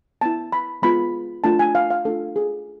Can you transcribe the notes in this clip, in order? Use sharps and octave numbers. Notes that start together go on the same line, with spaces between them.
B3 E4 A5
B5
G#3 B3 F4 B5
A3 D4 F4 A5
G#5
F5
F5
A3 D4 F4 A4
G#4